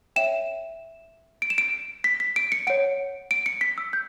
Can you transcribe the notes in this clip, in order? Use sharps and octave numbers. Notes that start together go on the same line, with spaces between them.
C#5 E5 G5 E7
D7
E7
D7
B6
B6
D7
C#7
C#5 F#5 D7
D7
C#7
B6
E6
G6